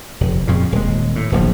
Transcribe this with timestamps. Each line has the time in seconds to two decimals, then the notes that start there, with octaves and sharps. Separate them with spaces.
0.21 F1
0.48 F2 A#2 C#3
0.72 D#1 G#3
1.16 A2
1.32 D1 A#1 F3